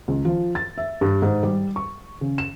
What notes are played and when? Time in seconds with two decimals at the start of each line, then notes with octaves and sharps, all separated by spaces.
0.08 C#2
0.25 F3
0.55 A6
0.78 E5
1.01 G2
1.22 G#2
1.43 G3
1.76 C#6
2.21 C#3
2.38 E7